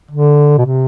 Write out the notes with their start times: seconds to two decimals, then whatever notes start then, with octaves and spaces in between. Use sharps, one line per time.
0.11 D3
0.58 B2
0.66 C3